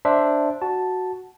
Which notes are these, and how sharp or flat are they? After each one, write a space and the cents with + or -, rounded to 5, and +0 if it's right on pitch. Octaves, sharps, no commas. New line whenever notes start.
D4 +0 C5 +0 E5 +0
F#4 +0 A5 +0